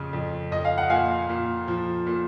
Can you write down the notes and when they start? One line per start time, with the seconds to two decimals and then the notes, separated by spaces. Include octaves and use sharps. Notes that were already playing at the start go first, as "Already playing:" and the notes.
Already playing: F2 C#3
0.13 F2
0.52 F2 D#5
0.65 F5
0.78 F#5
0.90 A#2 F5 G#5
1.29 A#2
1.68 F3
2.06 A#2